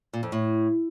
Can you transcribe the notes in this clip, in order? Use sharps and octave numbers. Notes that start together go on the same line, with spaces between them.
A#2
F2
A2